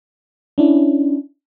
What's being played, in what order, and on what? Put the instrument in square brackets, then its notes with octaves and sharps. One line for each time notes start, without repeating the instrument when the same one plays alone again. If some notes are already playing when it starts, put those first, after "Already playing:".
[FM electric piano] C#4 D4 E4